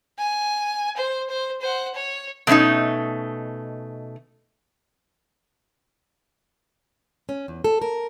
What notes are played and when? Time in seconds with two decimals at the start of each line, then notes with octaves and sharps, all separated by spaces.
0.18 G#5
0.97 C5
1.30 C5
1.61 C5 F#5
1.94 C#5
2.47 B2 A3 C4 C#4 D#4
7.29 C#4
7.48 E2
7.64 A4
7.82 A#4